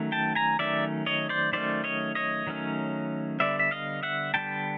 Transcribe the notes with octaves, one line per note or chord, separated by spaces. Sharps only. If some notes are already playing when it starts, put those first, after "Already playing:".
Already playing: D#3 F#3 A3 C#4
G5 A5
G#5 A#5
D#3 F#3 A3 C#4 D5 E5
C#5 D#5
C5 D5
D#3 F#3 A3 C#4 C5 D5
C#5 D#5
C#5 D#5
D#3 F#3 A3 C#4
D3 G3 B3 D5 E5
E5
D#5 F5
E5 F#5
D3 G3 B3 G5 A5